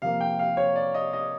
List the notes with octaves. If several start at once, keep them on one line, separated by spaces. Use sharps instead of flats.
C3 F3 A#3 F5
G5
F5
C#5
D5
D#5
D#5